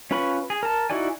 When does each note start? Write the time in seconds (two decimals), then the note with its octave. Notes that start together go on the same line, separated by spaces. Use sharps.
0.11 C#4 F4 B4 B5 C#6
0.50 G#4
0.63 A#4 A5
0.90 D#4 E4 F#4 D5 G#5